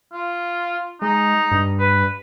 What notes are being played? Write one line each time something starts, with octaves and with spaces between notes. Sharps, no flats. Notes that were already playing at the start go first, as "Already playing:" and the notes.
F4
G#3 D#4
G2
B4